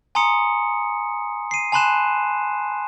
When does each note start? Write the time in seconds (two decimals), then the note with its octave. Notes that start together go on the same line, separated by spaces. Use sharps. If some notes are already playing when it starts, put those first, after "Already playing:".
0.15 G#5 A#5 C6 D#6 C#7
1.51 C7 D#7
1.72 G#5 A5 B5 C6 F#6 E7